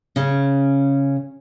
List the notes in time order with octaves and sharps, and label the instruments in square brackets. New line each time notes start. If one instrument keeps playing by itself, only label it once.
[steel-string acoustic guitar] C#3 C#4